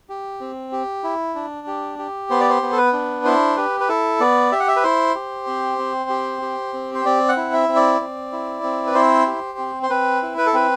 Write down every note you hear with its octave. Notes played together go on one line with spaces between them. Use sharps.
G4
C4
G4
E4
D4
G4
G4
B3 C5
D5
C5
B3
A4
B4
D4
E4 C5
G4 B4
B4
E4 A4
B3 D5
G4 E5
F#5
E5
B4
E4 C5
G4
C4
C4
G4
G4
C4
C5
C4 D5
F#5
E4
E5
C4
D5
C4
E4
C4
B4
E4 C5
G4
C4
C5
C4 B4
E4
B4
A4
C4 B4